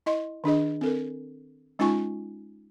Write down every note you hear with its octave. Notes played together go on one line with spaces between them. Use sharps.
E4 D#5 C6
D#3 D4 G#4 D#5
C4 A4 A#4
G#3 C#4 D#4 F4 G#5 C#6